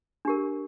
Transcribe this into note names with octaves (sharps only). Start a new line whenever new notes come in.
D4 G4 A#4